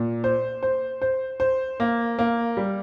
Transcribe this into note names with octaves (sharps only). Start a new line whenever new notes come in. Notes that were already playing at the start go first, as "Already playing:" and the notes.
Already playing: A#2
C5
C5
C5
C5
A#3
A#3
G3